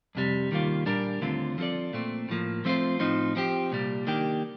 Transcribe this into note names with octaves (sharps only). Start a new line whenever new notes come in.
F2 C3 G3
D#2 D#3 G3 A#3 F4
A#2 G3 D4 G4 A#4
D#2 D3 A3 C4 F4
F3 C4 F4 A4 D5
A#2 A3 C4
A2 F3 A#3
F3 A3 C4 F4 C5
A2 F3 C4 D#4
F3 C4 G4
C2 A#2 G3
D#3 A#3 D4 G4